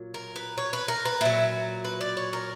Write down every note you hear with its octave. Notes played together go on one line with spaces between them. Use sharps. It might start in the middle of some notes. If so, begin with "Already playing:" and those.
Already playing: A#2 F#3
A#4
B4
C#5
B4
A#4
B4
A#2 F#3 E4
B4
D5
C#5
A#4